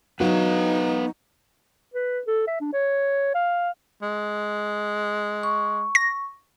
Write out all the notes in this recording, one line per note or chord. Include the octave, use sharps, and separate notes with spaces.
F#3 B3 D#4 B4 F5
B4
A4
E5
D4
C#5
F5
G#3
C#6
A#6